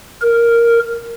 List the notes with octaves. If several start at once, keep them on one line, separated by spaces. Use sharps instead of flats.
A#4